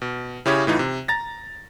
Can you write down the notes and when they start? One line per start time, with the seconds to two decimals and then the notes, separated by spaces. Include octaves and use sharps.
0.02 B2
0.46 C#3 C#4 E4 G4 G#4 C#5
0.67 A2 E3 D#4 F4
0.79 C3
1.08 A#5 A6 A#6